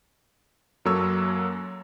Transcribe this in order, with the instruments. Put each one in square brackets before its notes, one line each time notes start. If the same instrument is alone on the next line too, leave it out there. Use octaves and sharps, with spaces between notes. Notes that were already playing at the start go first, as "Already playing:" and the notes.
[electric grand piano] F#2 F#3 A#3 A4 C#5 E6